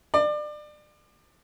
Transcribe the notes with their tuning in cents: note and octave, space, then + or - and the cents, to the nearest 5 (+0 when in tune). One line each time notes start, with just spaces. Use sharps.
D5 +30